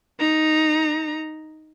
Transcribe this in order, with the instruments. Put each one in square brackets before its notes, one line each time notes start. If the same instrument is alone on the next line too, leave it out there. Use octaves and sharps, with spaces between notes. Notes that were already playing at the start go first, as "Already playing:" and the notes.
[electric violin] D#4 A#5